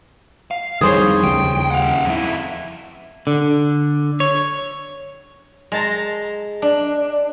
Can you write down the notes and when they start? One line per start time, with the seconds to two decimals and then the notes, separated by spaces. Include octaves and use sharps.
0.51 F5
0.81 F2 D#3 G3 G#4 C5 C#5
1.24 D#2 C#3 G3 G5
1.71 F5 F#5
2.05 F2 E4
3.27 D3
4.20 C#5
5.72 G#3 A5 A#5
6.62 D4